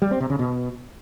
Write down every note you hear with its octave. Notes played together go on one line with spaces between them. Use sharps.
G3
C4
C3
C#3
B2